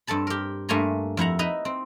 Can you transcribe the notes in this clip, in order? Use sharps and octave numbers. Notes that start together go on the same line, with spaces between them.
G2 C4 A4 A5 B5
G4 A#4
G2 A3 A#3 G#5 A#5 C6
F2 E4 F#5 A#5
D#4 E4 B4 D#5 A#5
C4